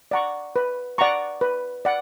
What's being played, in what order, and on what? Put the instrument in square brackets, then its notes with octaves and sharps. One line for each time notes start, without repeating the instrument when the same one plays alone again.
[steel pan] D5 F#5 A#5 C#6
B4
D5 F#5 A#5 C#6
B4
D5 F#5